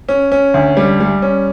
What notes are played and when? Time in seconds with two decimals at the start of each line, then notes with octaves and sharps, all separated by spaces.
0.09 C#4
0.32 C#4
0.54 D2
0.77 G3
1.00 G3
1.22 C#4